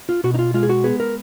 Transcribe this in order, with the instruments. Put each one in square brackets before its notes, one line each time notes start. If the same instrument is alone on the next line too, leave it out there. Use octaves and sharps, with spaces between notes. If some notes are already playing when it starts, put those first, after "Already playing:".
[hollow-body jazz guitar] F4
B2 F#4
D#4
F4
G#3 F4
G#4
F#4
B3 G#4
A#4